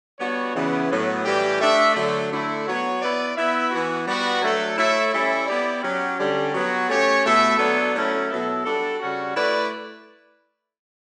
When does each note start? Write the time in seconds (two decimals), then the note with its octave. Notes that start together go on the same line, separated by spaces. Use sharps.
0.19 G3 B3 D4 F#4 C#5
0.55 C#3 E3 B3
0.89 A2 F#3 B3
1.25 A2 E3 G3 D4 G4
1.60 A3 D4 A4 E5
1.95 D3 F#3 A3
2.31 D3 A3 E4
2.66 F#3 B3 F#4 C#5
3.00 B3 E4 B4 D5
3.36 B3 E4 B4 E5
3.71 E3 B3 F#4
4.06 G3 B3 F#4
4.41 F#3 A3 D4 A4
4.77 A3 E4 A4 C#5 E5
5.12 G3 C#4 E4 A4 E5
5.47 B3 E4 G4 D5
5.83 F#3 C#4 G4
6.18 D3 G3 C#4
6.53 F#3 B3 F#4
6.89 A3 C#4 G4 C#5
7.24 B2 A3 E4 A4 E5
7.58 F#3 B3 D4 A4
7.94 F#3 A3 C#4 E4
8.29 B2 F#3 B3 E4 A4
8.64 G3 D4 F#4 A4
9.00 C#3 G3 C#4 F#4
9.35 A3 E4 B4 D5